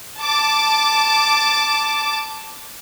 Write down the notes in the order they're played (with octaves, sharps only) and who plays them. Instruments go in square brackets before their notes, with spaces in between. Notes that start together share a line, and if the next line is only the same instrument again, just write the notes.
[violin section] A5 D6